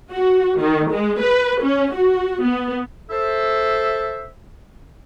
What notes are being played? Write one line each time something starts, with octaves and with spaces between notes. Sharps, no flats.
F#4
D#3
G#3
B4
C#4
F#4
B3
A4 C5 E5